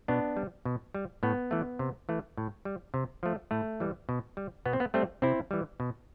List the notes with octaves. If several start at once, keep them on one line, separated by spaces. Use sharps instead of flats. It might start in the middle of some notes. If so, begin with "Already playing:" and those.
B2 B3 D4
G3
B2
G3
A2 B3
E3 A3
C3
E3 A3
A2
G3
C3
F3 A3
A2 A3
E3 G3
B2
G3
B2 B3
C4
B3
G3 A3 C4
C3 C4 E4
E3 G3
B2